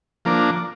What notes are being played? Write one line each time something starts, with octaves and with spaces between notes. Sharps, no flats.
F3 A#3 D4